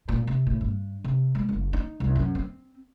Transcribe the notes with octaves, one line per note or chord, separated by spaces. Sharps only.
A#2
C3
A2
G2
C3
G#3
F#1
D#4
C2
F#2
C4